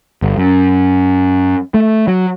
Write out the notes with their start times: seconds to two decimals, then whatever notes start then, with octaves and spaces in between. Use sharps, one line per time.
0.22 G1
0.38 F#2
1.74 A3
2.08 F#3